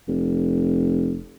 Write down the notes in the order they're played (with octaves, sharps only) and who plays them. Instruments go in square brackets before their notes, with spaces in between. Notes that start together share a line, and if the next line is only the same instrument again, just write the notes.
[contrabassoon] F1